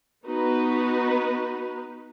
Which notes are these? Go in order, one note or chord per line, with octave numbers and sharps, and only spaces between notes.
B3 D#4 F#4 B4